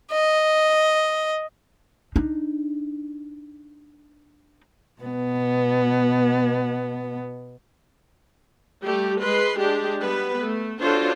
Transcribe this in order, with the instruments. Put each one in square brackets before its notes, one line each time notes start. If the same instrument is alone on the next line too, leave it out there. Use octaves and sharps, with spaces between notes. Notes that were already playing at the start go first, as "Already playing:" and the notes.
[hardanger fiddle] D#5
[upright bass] D4 D#4
[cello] B2 B3
[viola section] G3 A3 G4
G#3 B4 C6
G#3 D4 G4
G3 B3 B4
A3
D4 F4 F#4 A4 C5 C#5